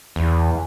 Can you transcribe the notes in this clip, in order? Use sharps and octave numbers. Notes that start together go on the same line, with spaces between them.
E2